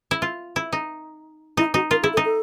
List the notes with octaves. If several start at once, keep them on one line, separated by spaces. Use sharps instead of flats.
E4
F4
E4
D#4
D#4 E4
D#4 F#4
F4 A#4
E4 G#4
A4
D#4
A4